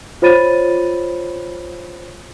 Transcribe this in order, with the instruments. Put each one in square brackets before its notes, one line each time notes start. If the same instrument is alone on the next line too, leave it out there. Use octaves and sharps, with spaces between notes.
[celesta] F4 C5 C#5 B5 A6 D#7